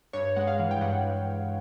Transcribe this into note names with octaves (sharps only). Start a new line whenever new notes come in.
G2 C#5
G#3 F#5
F5
E3
G5
G2 F#5